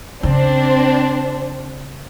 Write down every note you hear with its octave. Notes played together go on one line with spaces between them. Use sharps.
C#3 C4 D4 C5